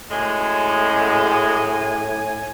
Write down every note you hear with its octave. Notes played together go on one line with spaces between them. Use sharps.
F#2 A2 G#3 G#5